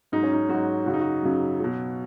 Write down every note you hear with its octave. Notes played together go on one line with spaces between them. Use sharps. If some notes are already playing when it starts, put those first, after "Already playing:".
G#2 F#3 D#4
C#4
D#4
G#2 F#3 F#4
F#2 C#3 F#3 F#4
D#4
F#4
F#2 C#3 F#3
B2 F#3